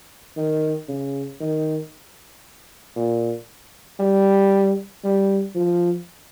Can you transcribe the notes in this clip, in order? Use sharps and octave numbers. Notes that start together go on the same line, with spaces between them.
D#3
C#3
D#3
A#2
G3
G3
F3